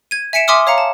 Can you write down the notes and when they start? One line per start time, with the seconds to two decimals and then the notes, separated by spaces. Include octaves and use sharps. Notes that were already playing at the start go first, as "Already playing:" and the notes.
0.11 G#6 D#7
0.33 E5 G#5 B6 C#7 D7 E7
0.48 E5 G#5 C6 D6 D#6 F6
0.67 C#5 F5 A#5 C#7
0.78 A5